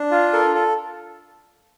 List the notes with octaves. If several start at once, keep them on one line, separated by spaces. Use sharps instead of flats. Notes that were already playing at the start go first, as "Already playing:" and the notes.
Already playing: D4
F4
A4 A#4
A4